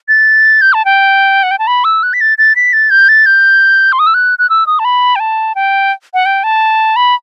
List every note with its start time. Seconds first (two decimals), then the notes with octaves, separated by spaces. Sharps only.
0.08 A6
0.61 G6
0.73 A5
0.85 G5
1.43 F#5
1.51 G5
1.59 A5
1.67 B5
1.84 E6
2.03 F#6
2.13 B6
2.21 A6
2.38 A6
2.56 B6
2.73 A6
2.90 G6
3.09 A6
3.26 G6
3.92 C6
3.99 D#6
4.07 E6
4.14 F#6
4.39 F#6
4.50 E6
4.67 D#6
4.79 A5
4.85 B5
5.16 G5
5.20 A5
5.55 G5
6.14 F#5
6.26 G5
6.44 A5
6.96 B5